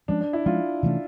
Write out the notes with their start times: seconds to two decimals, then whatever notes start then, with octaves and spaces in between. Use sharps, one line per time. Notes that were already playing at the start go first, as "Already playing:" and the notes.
0.08 F3 G#3 C#4 D4
0.21 D4
0.33 E4
0.46 F3 G#3 C#4 F4
0.83 C3 E3 A3 C#4